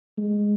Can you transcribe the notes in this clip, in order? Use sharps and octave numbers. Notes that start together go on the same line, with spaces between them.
G#3